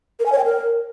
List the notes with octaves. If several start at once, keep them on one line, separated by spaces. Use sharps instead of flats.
A#4
G#5
C#5
G5
A#4